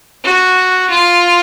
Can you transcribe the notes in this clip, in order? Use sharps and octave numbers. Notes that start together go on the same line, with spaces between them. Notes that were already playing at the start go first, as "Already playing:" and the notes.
F#4
F4